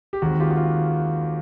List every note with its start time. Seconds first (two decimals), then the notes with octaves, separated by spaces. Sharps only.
0.13 G4
0.22 D#2 D#3 G#3 C4 F#4
0.40 F4 G4
0.50 F#4
0.56 F4